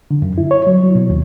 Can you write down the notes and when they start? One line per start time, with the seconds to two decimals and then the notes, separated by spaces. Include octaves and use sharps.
0.11 D3
0.22 F#2
0.38 E4
0.51 C#5
0.67 F#3
0.83 F#3
0.95 B2
1.10 D#2